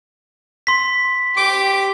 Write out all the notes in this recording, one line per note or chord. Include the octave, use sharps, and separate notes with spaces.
C6 B6
G4 D6